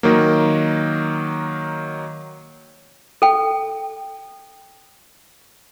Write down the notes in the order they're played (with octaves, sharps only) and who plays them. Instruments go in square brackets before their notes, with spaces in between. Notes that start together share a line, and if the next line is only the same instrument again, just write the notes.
[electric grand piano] D#3 F#3 A#3
[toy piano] A4 G5